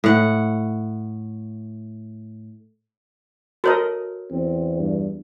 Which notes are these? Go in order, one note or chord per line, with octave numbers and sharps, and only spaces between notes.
A2 F#5
F#4 A4 A#4 C#5 D#5
E2 C4
G2